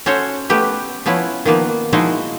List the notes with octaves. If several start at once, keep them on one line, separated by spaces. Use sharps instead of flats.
C#4 F#4 A4 C5 C#5
A3 B3 G4 B4
F3 B3 C#4 E4
D#3 F3 A#3 B3
F3 G#3 D#4 E4 F#4